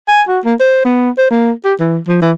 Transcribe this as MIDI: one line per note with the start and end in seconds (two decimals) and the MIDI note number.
0.08 0.22 80
0.28 0.40 66
0.45 0.54 58
0.60 0.82 72
0.85 1.10 59
1.18 1.28 72
1.31 1.52 58
1.65 1.74 67
1.80 1.98 52
2.08 2.18 53
2.22 2.32 52